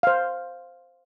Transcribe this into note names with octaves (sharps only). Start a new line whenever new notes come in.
C5 F5